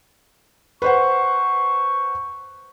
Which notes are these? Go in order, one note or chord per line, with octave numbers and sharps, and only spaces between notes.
B4 C5 F#5 C#6